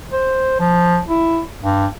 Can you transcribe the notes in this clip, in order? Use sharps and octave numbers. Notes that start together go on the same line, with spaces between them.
C5
F3
E4
G2